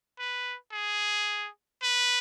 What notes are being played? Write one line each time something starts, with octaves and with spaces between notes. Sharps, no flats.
B4
G#4
B4